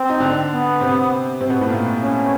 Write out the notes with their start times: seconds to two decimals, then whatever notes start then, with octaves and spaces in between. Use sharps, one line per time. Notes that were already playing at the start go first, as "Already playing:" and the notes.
Already playing: C4
0.10 D#4
0.20 D3 D4
0.51 B3
0.81 C3 C4
1.41 C3 C4
1.50 B2 B3
1.61 A2 A3
1.70 A#2 A#3
2.01 C#4